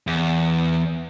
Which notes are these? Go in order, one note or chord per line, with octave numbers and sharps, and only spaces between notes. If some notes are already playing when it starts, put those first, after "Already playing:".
E2